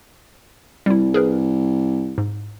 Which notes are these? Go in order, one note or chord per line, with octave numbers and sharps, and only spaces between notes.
C2 G3 E4
G#4 A#4 B4
G#2